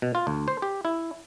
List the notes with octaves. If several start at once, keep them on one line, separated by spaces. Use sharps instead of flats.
B2
F4
D2
C5
G4
E4